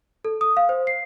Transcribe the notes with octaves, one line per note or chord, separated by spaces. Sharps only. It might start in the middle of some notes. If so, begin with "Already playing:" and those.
A4
D#6
F5
C5
C7